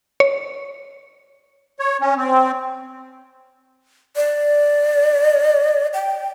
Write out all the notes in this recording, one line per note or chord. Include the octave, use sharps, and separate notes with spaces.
C#5
C#5
C#4
C4
D5
G5